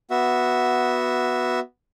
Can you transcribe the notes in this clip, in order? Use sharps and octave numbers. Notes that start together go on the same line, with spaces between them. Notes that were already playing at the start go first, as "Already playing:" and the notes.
B3 F#4 E5